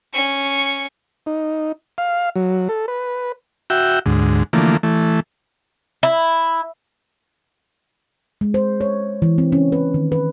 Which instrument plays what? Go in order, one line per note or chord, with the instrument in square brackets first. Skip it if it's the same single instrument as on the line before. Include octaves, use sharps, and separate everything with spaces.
[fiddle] C#4 C#6
[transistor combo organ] D#4
F5
F#3
A4
B4
F#4 E5 G5
D2 G#2
D3 E3 F3 A3 A#3
E3 A3
[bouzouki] E4
[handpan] G#3
C5
C#5
E3
C4
C#4
B4
D#3
B4